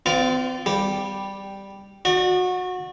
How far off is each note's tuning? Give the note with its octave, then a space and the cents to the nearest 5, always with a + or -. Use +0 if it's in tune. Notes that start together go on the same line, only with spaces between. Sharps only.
C4 -40 F4 +0 D5 +0
G3 +5 G4 -5
F#4 -25 D5 +35